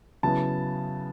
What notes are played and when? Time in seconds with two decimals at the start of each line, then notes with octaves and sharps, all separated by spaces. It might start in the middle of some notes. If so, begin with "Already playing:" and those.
0.23 C#3 F#3 B3 E4 A5